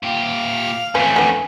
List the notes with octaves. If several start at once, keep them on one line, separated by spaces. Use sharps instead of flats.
A#2 G4 F5
F2 A3 C#4 B4
D3 B3